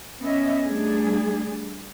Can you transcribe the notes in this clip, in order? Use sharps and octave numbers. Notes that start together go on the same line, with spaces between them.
B3 C#4 D#5 E5
G3 A3 D4 G#4